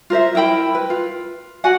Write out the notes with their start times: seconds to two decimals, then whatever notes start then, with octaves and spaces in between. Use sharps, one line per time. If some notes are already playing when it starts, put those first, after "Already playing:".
0.10 F4 A#4 C5 E5
0.35 E4 A#4 G5 B5
0.75 B4
0.90 F4
1.64 F#4 D5 F#5 G#5